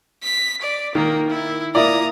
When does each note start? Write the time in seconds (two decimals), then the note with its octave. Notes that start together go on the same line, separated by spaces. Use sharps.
0.23 B6
0.62 D5
0.95 D#3 A#3
1.30 E4
1.75 A#3 E4 D5 A#5 D#6